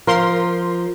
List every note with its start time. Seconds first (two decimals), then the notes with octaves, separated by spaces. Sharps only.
0.07 F3 A#4 C6